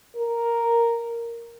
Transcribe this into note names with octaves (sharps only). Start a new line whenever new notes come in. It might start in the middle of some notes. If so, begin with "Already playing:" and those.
A#4